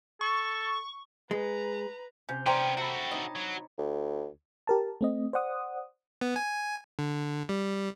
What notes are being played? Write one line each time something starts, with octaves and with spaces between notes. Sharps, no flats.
A4 C#6
G#3 B4 A#5
C3 C#4 F5 G6
B3 C#4 C5 D5 G5 A#5
F#3 F#4 A4 E5 B5
D4 D#4 C#5 D#5
F#3
D2
G4 A#4 A5
A3 C4 D#5
C5 D5 F#5 D#6
B3
G#5
D3
G3